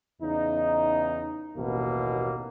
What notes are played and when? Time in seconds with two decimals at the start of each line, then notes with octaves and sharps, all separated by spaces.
0.21 E2 C#3 D#4
1.57 A1 D#2 B2 A#3